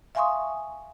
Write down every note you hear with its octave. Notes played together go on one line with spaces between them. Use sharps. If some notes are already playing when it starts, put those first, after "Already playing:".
E5 F5 G#5 C6 C#6 D#6